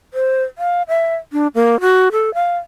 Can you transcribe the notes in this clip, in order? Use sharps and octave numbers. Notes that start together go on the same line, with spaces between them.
C5
F5
E5
D4
A#3
F#4
A4
F5